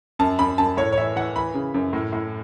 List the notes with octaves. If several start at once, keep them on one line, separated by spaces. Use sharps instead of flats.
F#2 A5
F#2 B5
F#2 A5
A2 C#5
C#5
E3 E5
E3 F#5
E3 B5
C#3
F#2
A2
A2